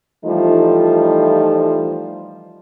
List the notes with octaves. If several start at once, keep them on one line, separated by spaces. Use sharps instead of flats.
E3 F3 G3 A3 D#4 F4